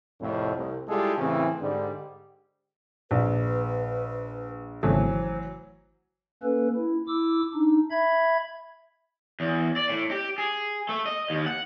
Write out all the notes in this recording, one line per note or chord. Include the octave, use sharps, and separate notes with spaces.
C2 F2 A2
C2
G3 G#3 E4 F4 G4 A4
A2 C#3 E3 C4
G#2 D3 G3
A#1 B4
G#1 C#3 E3 F#3 A3 C5
A#3 C#4 A4 B4
E4
E4 D6 E6
D4 D#4
E5 B5 G#6
E2
D5
A2
G4
G#4
A3
D#5
D#2
F#5